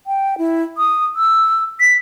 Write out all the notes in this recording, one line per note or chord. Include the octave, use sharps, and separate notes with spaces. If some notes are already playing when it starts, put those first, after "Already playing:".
G5
E4
D#6
E6
B6